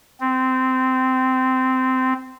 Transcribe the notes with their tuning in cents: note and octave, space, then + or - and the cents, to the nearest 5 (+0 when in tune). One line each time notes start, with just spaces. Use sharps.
C4 -15